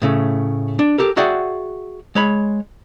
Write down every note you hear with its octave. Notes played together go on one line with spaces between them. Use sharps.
A2 C#3 A3
D4
G4 A4 A#4
F#4 G#4 D5 E5 F#5 G5
G#3 C#5 B5